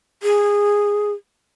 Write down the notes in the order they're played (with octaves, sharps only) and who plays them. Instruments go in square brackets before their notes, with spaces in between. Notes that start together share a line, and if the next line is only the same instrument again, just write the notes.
[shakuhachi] G#4